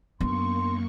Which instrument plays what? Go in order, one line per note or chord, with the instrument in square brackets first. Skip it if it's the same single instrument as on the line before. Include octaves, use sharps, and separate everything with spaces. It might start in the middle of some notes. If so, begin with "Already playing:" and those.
[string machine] F#2 A#3 C#6 [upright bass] B3 D4 [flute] C6